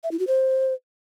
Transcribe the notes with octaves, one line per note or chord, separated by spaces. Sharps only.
E5
E4
F#4
C5